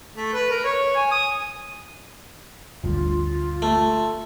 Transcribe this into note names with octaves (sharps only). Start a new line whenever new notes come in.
A3
B4
A#4
C#5
G#5
D#6
G1 D2 G2 F4
A3